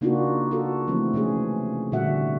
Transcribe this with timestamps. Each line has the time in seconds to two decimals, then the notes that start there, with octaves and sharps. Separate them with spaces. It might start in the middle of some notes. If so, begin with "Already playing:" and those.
0.01 C#3 A#3 D4 D#4 F4 F#4
0.51 F#4 A4
0.88 E3 F3 A3 C4
1.14 C3 G#3 C#4 G#4
1.92 A#2 D3 G3 F#4 E5 F#5